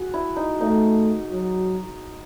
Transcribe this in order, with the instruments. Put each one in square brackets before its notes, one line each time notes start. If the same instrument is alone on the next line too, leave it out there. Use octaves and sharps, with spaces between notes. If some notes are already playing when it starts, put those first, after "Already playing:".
Already playing: [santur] F#4 G#4
E4
D#4
[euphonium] A3 [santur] D#4
[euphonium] F#3